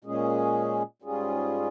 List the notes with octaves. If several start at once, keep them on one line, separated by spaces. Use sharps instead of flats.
A#2 G#3 C#4 G#4
G#2 G3 C#4 F4 G#4